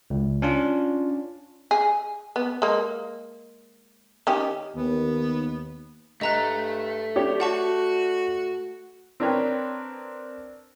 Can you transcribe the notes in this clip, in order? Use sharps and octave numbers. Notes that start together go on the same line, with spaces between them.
C#2
C#4 D4 F4
G#4
B3
G#3 A#3
D#3 C#4 G4
D#2 B3
G2 A3 D#5 A#5 F#6
D4 G4 C#5
F#4 F#5 A5 C#6
C4 D4 A#4 B4 C#5 G5